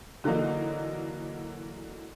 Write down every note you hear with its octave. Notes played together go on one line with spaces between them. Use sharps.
D3 E3 F#3 A#3 D#4